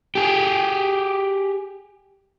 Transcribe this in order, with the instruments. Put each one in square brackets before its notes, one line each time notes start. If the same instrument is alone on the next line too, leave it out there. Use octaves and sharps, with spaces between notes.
[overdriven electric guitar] G4 G#4